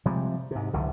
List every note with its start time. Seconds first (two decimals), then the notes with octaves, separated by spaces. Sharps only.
0.05 C3 F3 G3 G#3
0.51 G#2 C3
0.73 F#1 C#2 D3 D#3